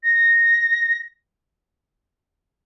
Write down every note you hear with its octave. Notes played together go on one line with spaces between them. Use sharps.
A#6